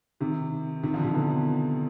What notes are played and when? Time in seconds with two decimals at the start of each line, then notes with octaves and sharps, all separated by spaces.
0.20 C3 D#3
0.83 C3 D#3
0.94 D3 F3
1.04 C3 D#3
1.14 B2 D3